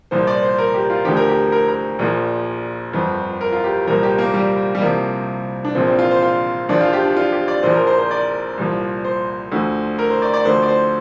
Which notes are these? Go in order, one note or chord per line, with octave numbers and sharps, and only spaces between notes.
C2 A#2 F3 C5
D5
C5
A#4
G4
F4
D2 D3 F3 G4
A#4
G4
A#4
A#4
A#1 A#2 F3
G1 F2 F3
A#4
F4
G4
C2 A#2 F3 A#4
G4
A#3
G3
G3
C2 C3 F3 A#3
D4
A#1 A#2 F3 C4
C4
F4
C5
F4
A#1 A#2 F3 D4
F4
G4
D4
F4
G4
D5
A#1 A#2 F3 C5
A#4
C5
C5
D5
C2 A#2 F3
C5
D2 D3 F3
A#4
C5
D5
D5
D2 D3 F3 C5
D5
C5